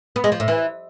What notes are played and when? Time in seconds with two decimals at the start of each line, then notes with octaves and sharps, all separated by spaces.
0.16 B3
0.24 G#3
0.32 F3
0.40 A2
0.48 E3